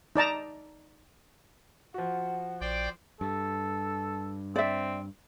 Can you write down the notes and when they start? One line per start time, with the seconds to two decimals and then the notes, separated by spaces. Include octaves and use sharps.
0.16 D#4 D5 A5 A#5
1.94 F3 F#4 F#5
2.61 A#1 C5 D5 G5
3.21 G2 A4
4.56 C4 D5 E5